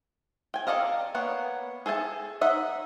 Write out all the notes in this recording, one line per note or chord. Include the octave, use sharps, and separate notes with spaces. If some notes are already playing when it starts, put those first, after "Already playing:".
G5 G#5
A4 D5 D#5 F5 A#5
A#3 B3 B4 C#5
G#4 A4 E5 G#5 A5
D#4 D#5 E5 F#5